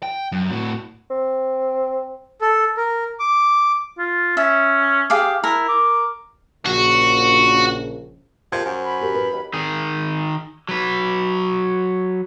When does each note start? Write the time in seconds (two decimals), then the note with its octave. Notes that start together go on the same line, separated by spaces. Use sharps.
0.03 G5
0.32 F#2
0.50 A2 F#4
1.10 C4
2.41 A4
2.77 A#4
3.20 D6
3.98 F4
4.37 C#4 E5
5.10 G4 G#4 F5 D6
5.44 E4 A#4
5.69 D6
6.66 A#1 C#3 F#4
8.52 C3 F3 A#3 G#6
8.66 F#2 F#4 C5 G#5
8.84 B5
9.01 G4 A#4
9.15 B4
9.32 D#2
9.54 D#3 G#4
10.69 F#3 B4